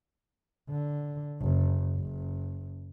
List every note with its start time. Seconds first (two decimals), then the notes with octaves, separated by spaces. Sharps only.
0.70 D3
1.41 F#1
1.96 F#1